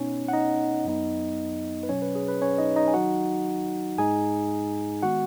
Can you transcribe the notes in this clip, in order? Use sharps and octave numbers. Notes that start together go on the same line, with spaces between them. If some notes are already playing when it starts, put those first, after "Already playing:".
Already playing: B2 B3 C#4 D#4 C#5
F#5
D#4 D#5
F#2 F#3 B3 D#4
B4
B2 F#3 C#4 C#5
B4
G#4
B4
C#4 C#5
D#4 D#5
D#4 D#5
G#5
D#3 F#3 D#4 F#4 F#5
G#2 G#3 D#4 G#4 G#5
D#3 G#3 B3 F#4 F#5